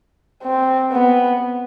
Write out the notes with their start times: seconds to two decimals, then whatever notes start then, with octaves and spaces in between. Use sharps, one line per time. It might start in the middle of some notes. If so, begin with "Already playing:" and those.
0.43 C4
0.92 B3